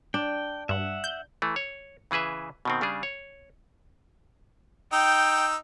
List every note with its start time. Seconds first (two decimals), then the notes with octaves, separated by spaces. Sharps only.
0.14 D4 G5
0.69 G2 E5 F#5
1.04 G6
1.42 E3 A3
1.56 C#5
2.11 C#3 E3 G#4 B4 E5
2.65 B2 D#3 C4
2.81 C#3 G3 D4 G#4
3.03 C#5
4.93 D#4 G5 E6